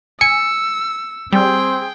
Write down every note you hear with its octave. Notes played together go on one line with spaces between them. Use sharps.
G#5 E6 C#7
G3 C4 G#4 G5